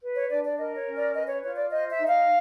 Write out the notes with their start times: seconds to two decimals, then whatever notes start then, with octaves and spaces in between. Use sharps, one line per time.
0.02 B4
0.16 C#5
0.29 D4 D5
0.45 D5
0.58 A#4 D#5
0.76 C#5
0.86 C#4
0.96 D5
1.14 B4 D#5
1.28 C#5
1.42 F4 C#5
1.56 D5
1.71 C5 D#5
1.90 E5
1.98 D#4
2.08 F5